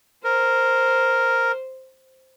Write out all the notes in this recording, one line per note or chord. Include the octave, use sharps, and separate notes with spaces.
A#4 C5